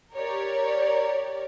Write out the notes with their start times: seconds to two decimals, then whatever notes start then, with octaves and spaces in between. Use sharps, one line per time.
0.15 G4 A#4 C#5 D5